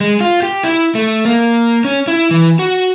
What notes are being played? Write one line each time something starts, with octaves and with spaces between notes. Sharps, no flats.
G#3
F4
G4
E4
A3
A#3
C#4
E4
E3
F#4